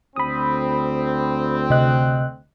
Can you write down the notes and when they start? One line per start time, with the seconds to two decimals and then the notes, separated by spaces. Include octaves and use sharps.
0.16 D2 C4 B5 D#6
1.70 C3 D#5 F#6